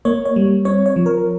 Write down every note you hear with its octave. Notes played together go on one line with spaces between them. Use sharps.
A#3 C#5
C#5
G3
C4 C#5
C#5
F3
A#4